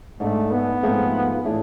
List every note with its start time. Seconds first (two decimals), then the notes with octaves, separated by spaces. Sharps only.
0.20 G#2 G#3 A3 D4
0.51 B3
0.83 G#2 F3 A3 C4 G#4
1.44 A2 E3 A3 D4 G#4